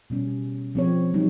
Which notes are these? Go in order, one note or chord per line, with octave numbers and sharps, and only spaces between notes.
B2 G3 C#4
F3 C4 C#5
F#3 G3 D#4